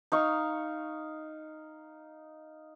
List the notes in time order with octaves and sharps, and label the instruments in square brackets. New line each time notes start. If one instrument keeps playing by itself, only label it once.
[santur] D#4 F5 C#6